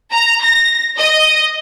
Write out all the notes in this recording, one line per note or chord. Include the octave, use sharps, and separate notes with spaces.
A#5
A#6
D#5